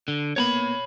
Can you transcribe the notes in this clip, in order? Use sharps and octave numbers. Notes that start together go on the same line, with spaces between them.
D3
A#3 B3 C#5 A#5 B5 G#6